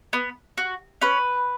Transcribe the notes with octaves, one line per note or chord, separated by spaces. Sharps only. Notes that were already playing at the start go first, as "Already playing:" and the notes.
B3
F#4
C#4 B4